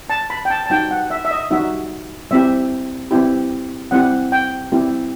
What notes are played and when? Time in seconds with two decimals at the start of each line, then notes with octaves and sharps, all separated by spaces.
0.10 A5
0.30 B5
0.45 G5
0.50 A5
0.66 A5
0.70 G3 D#4 F#4 G5
0.91 F#5
1.10 E5
1.25 E5
1.31 D#5
1.51 G3 D#4 F#4 E5
2.31 G3 C4 E4 G4 E5
3.11 G3 C4 E4 G4
3.91 G3 C4 E4 G4 F#5
4.32 G5
4.72 G3 C4 E4 G4